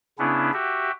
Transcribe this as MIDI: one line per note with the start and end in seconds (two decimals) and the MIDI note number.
0.19 0.51 49
0.19 0.51 59
0.19 0.51 61
0.19 0.51 62
0.19 0.51 64
0.53 0.91 66
0.53 0.91 67
0.53 0.91 76